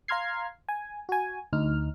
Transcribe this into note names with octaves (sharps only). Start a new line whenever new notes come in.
F5 A#5 C6 F6 G#6 C7
G#5
F#4 G#5
D2 D#4 F6